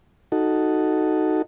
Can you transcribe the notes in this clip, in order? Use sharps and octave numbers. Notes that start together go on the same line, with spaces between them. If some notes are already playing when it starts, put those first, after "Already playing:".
D#4 F#4 A4